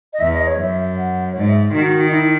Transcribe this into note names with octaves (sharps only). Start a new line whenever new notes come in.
D#5
E2 E5
D#5
C#5
F#2 E5
F#5
C#5
G#2 D#5
E5
D#3 F#4
D#4
E4